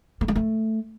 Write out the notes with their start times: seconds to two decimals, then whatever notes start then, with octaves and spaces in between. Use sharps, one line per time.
0.21 A3
0.28 G#3
0.36 A3